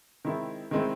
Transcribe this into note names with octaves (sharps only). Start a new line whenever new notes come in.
D#3 G#3 C4 E4
D#3 G#3 C4 E4